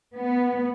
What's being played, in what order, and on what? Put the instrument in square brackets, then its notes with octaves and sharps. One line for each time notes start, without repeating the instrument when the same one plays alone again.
[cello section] B3